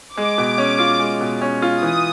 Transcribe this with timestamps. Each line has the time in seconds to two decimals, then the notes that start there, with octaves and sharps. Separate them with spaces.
0.17 G#3 D6
0.38 B2
0.58 C#4
0.79 F4
0.99 G#3
1.21 B2
1.41 C#4
1.62 F4
1.82 E3 D#6